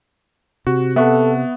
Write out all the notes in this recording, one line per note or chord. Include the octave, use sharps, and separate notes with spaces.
C3 F#4
B3 A4 E5 F#5 C#6